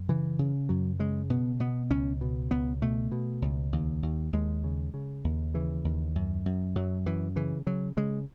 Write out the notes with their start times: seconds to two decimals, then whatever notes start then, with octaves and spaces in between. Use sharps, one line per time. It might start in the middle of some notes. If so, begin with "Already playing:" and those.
Already playing: F#2
0.08 C#3 E3
0.39 C#3
0.69 F#2 F#3
0.99 C#3 G#3
1.30 B2 B3
1.60 B2 B3
1.90 C#2 C#4
2.21 B2
2.51 C#2 B3
2.82 B2 A3
3.12 B2
3.42 C#2
3.72 D#2
4.03 D#2
4.33 D#2 G#3
4.64 C#3
4.94 C#3
5.24 D#2
5.54 C#3 E3
5.84 D#2
6.15 F#2
6.45 F#2
6.75 F#2 F#3
7.06 F#2 E3
7.36 C#3 E3
7.67 C#3 F#3
7.97 C#3 G#3